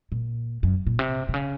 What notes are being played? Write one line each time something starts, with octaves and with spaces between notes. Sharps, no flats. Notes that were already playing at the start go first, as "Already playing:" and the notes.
A#2
F#2
A#2
C3
C3
C#3